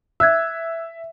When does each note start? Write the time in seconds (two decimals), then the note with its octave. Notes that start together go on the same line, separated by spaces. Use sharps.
0.20 E5 E6 F#6 G#6